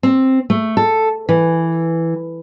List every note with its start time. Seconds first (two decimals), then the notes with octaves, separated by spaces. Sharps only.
0.03 C4
0.50 A3
0.77 A4
1.29 E3